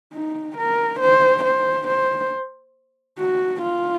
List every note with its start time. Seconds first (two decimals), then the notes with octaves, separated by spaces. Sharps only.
0.14 D#4
0.57 A#4
1.00 C5
1.44 C5
1.88 C5
3.19 F#4
3.62 F4